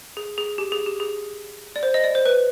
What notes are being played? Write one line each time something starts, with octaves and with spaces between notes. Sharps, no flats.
G#4
G#4
G4
G#4
G4
G#4
D5
C5
D#5
D5
C5
B4